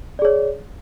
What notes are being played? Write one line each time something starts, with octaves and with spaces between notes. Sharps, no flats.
G#4 C#5 D5